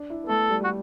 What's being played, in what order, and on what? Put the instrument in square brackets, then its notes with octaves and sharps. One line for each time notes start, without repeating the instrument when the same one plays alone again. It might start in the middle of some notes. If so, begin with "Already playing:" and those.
Already playing: [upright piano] D4
E4
B3
[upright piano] A3 [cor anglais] A4
[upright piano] G3
G3
[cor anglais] F#4